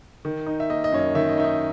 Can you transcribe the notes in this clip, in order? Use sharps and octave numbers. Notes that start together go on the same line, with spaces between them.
D#3
D#4
E5
A#3 D#5
D#5
F#2 C#5
D#5
D#3 E5
D#5
D#4 E5
D#5